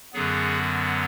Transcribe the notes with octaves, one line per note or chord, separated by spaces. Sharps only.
F#2 D3 F#3 B3 G#4